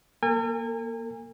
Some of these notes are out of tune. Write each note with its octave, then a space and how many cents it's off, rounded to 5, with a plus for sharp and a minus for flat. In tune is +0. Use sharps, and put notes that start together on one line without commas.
A#3 +15 A#4 -45 G#5 -35